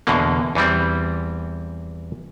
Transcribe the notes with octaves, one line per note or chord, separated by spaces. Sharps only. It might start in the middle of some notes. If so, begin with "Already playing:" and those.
E2 B2 D3 A#3
E2 E3 G3 C4